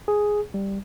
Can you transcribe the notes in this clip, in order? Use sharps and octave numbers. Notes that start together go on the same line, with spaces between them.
G#4
G3